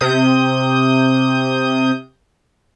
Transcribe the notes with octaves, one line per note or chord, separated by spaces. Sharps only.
C3 D#6 G6